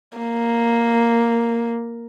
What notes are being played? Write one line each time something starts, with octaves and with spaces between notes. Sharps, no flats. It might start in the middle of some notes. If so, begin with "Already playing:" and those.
A#3